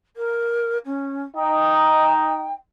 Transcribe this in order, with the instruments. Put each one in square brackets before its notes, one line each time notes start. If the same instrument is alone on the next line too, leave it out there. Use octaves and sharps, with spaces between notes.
[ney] A#4
C#4
[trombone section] D#4 [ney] G5